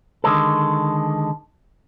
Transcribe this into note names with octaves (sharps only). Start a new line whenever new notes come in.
D3 D#3 G#3 A4